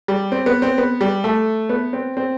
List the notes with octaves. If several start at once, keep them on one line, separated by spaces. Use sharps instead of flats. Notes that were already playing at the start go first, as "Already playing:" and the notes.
G3
C4
B3
C4
B3
G3
A3
B3
C4
C4